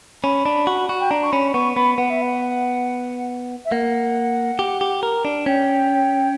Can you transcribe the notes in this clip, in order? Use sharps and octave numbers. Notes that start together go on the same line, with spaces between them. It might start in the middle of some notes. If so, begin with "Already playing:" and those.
C#4 B5
D4
F#4
F#4
G5
D4 A#5
C#6
C#4 B5
B3 C#6
B3 B5
B3 F#5
E5
F#5
E5
A#3 F#5
G4
G4
A#4
D4
C#4 G5